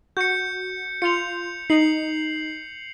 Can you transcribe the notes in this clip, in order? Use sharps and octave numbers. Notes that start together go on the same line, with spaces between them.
F#4 G6 C#7
F4 C6 C#7 F7
D#4 C7 F#7